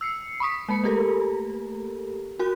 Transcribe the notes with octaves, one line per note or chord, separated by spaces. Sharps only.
E6 C7 C#7
B5 C#6 D#6 B6
G#3 A#3 B5 C#7
A3 A#3 G4 A4 A#4
F#4 A#4 F#6